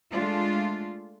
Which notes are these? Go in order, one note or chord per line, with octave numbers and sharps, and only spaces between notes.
G#3 A3 D4 F4